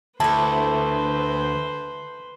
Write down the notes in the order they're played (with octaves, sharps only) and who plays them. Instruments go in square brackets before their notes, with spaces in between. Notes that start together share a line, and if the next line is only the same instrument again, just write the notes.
[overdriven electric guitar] D2 [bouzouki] E4 A4 [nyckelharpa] B4 C5 [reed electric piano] A5